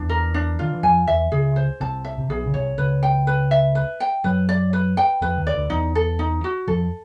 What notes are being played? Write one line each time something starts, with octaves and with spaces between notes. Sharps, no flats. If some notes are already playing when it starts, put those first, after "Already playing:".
Already playing: E2 E3 D4
A#4
D4
D#3 F4
E3
F2 F3 G#5
E2 E3 E5
C#2 C#3 G#4
C5
C2 C3 A5
E5
C3
B1 B2 G#4
C#3
C2 C3 C#5
C#2 C#3 B4
G5
B4
E5
B4
G5
F#2 F#3 B4
D5
B4
G5
F2 F3 B4
D#2 D#3
D5
D2 D3
E2 E3 D#4
A4
D#4
F#4
F2 F3 A4